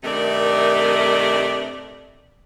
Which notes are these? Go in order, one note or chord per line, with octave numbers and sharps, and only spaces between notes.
G2 C3 D#3 A3 A#4 D5